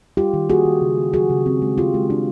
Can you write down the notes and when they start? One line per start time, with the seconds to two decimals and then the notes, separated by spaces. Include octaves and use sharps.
0.17 G3 F4 G4
0.34 D#3
0.49 A#3 F#4 G#4
0.65 D#3
0.81 C#3
0.97 A#3
1.13 F#3 F#4 G#4
1.30 C#3
1.46 C4
1.62 G#3
1.78 G#3 F4 G4
1.94 G#3
2.10 D4